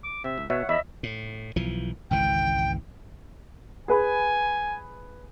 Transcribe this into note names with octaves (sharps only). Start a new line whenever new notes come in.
D6
C3 C4 E5
C#2
B2 C#5 E5 F#5
E2 D#5 E5 B5
A2
B1 E3 F3
G#1 C#2 E3 G5
G#4 B4 G#5 B5